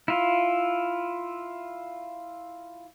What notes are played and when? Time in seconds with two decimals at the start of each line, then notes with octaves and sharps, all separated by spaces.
0.08 E4 F4